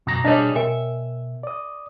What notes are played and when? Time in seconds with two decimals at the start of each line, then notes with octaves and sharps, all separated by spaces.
0.07 F#2 B2 A#5
0.25 B2 G3 D4 G#4 C#5 D#5
0.56 B2 A#4 E5 G5 G#5
1.43 D5 D#6